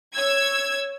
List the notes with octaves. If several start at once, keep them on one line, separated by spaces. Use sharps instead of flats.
C#5 E6 G#6